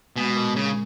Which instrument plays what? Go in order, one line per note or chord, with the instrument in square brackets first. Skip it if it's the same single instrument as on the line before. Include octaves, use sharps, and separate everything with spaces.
[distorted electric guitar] B2 [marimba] G#3
[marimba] A#2
[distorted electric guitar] C#3 [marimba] G#3